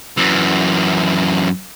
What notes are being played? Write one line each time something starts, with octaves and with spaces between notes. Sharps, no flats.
F#2 E3